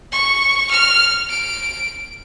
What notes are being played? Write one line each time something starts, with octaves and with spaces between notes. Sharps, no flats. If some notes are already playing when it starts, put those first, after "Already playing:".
C#6
F6
D7